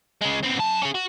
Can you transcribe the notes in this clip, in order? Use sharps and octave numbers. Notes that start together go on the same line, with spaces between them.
C#3 G#3
B3 C4
F#2 A5
C#4 G#4
F#4